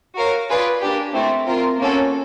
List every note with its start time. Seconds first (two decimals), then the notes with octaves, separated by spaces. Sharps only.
0.15 F#4 A#4 C#5 F5
0.49 F4 G#4 B4 D5
0.81 A#3 D4 G4
1.14 A3 C4 E4
1.47 C4 F4 A#4
1.79 A#3 C#4 F#4 A4